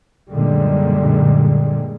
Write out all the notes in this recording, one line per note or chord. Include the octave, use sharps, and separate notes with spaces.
F#2 A#2 D3 G3 G#3